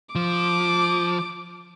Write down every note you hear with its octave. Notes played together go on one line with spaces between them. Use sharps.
F3 D6